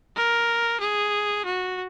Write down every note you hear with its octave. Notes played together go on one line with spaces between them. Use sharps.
A#4
G#4
F#4